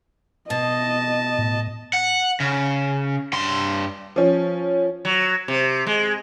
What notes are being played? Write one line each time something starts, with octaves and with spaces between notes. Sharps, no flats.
B2 D#5 A5
A2
F#5
C#3
G2 C6
F3 C#4
F#3
C3
G#3